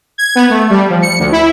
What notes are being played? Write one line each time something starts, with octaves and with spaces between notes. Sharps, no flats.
G#6
B3
A3
G3
F3
C#7
D2
E4